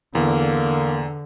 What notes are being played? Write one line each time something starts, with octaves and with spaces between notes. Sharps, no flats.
E2 D3 A#3